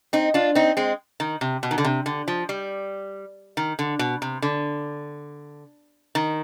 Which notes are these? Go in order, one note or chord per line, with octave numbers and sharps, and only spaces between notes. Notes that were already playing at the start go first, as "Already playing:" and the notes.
C4 D#4
D4 F4
C4 D#4
G#3 C4
D#3
C3
B2
D#3
D3
C3
D3
F3
G3
D#3
D3
B2
C3
D3
D#3